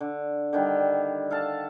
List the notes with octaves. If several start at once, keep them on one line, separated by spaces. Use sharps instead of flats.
D3
D3 D#3 G3
A4 F5 A5